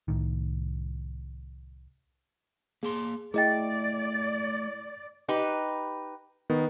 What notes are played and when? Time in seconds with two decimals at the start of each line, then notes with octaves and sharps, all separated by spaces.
0.08 C2 A2 D#3
2.83 A#3 G#4 A5 C6
3.34 A3 E4 G#4 D5 D#5 G5 A6
5.28 D#4 G4 B4
6.50 D#3 B3